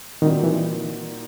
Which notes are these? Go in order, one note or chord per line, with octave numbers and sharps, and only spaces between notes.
A#2 D#3 G3 C4 D#4 F#4
E3